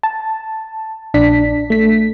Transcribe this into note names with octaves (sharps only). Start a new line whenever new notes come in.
A5
A#1 D4 B6
A3 B6